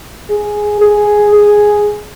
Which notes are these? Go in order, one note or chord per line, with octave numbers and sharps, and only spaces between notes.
G#4
G#4
G#4